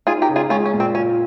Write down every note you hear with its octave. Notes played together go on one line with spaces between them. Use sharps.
D#4 F4 G#4
G4 A#4
C#3
F4 G#4
G#3 C#4 F4
C#4
A#2
C4
C#4 F4